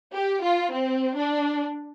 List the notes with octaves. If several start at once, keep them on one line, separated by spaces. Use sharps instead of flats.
G4
F4
C4
D4